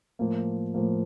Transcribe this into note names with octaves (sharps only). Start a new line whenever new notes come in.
A2 F3 A#3
A2 F3 A#3